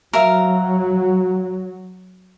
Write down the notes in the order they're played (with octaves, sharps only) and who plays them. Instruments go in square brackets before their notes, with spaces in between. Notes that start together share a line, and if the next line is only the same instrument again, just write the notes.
[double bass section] F#3 [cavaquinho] A#4 E5 F5